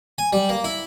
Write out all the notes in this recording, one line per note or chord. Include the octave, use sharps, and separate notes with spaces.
G#5
G3
A#3
E4